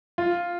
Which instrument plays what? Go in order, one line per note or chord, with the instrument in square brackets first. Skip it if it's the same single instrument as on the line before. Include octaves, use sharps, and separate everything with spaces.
[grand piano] F4